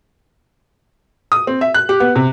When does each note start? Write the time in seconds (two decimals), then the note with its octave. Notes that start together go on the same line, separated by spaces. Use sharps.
1.32 D#6
1.47 C4
1.61 E5
1.74 F#6
1.89 G4
2.00 B3
2.16 C3